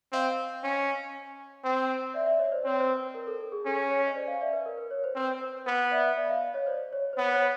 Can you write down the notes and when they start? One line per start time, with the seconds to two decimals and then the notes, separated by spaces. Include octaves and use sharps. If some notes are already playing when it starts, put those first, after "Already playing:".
0.13 C4 D#5 F5
0.64 C#4
1.64 C4
2.14 D5 E5
2.26 D5 E5
2.39 C#5 D#5
2.51 C5 D5
2.65 C4 C#5
2.80 C5
2.90 B4
3.14 A#4
3.27 A4
3.41 A4
3.52 G#4
3.66 C#4 A4
3.90 C#5
4.07 D#5
4.15 C5 D5
4.27 D#5 F5
4.41 D5 E5
4.53 B4
4.66 A#4
4.78 B4
4.91 C#5
5.04 C5
5.15 C4 B4
5.41 C5
5.67 B3 B4
5.91 D5 E5
6.17 D5 E5
6.29 D#5 F5
6.54 C#5 D#5
6.66 C5 D5
6.93 C#5
7.13 C5
7.17 B3 C#5
7.34 C#5